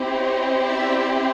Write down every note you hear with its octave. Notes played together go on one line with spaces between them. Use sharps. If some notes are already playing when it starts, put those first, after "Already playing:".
Already playing: C4 E4 G4
C#5 D#5
D5 E5